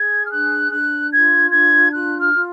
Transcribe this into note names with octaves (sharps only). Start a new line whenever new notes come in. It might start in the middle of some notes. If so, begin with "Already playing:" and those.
Already playing: G#4 G#6
F6
D4 F#6
D4 F#6
F4 G#6
D4 G#6
F4 F#6
F6
F4